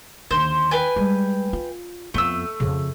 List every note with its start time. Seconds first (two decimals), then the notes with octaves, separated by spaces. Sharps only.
0.31 D#2 D3 C5
0.71 B4 G5 G#5
0.96 G3 G#3
1.53 F4
2.14 F2 A3 B3 E6
2.60 F2 C#3